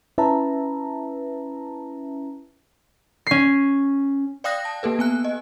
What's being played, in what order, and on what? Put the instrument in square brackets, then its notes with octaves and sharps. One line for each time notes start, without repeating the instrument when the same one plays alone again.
[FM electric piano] C#4 E4 B4 E5 A5 A#5
[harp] C#4 C7
[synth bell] D5 F5 G5 D#6 F#6 A#6
A5
A#3 G4 A4 B4
B3 G#5 F#6
D#5